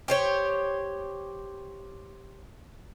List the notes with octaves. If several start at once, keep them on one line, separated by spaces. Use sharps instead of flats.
G4 C5 C#5